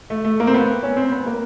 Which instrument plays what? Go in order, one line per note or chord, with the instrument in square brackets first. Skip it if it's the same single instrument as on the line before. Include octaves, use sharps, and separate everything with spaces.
[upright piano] A3
A3
A#3
C4
B3
C#4
C4
B3
A#3